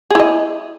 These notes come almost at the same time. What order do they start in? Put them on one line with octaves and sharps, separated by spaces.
G#4 E4 D#5